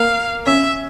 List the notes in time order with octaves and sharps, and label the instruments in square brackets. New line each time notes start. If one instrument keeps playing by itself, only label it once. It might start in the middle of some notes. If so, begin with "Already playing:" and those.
Already playing: [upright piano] A#3 [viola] F5
[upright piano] C#4 [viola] E5